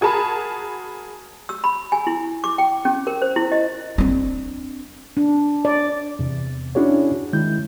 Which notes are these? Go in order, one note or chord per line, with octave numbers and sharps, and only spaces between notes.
F#4 G#4 A#4 A5 B5
E6
B5
G#5
E4
D6
G5
C#4
A#4
C5
E4
D#5
C4 D4
D4
D5
E2 C3
C#4 D4 E4 F#4 G#4 C#5
D#3 G#3 E4 G6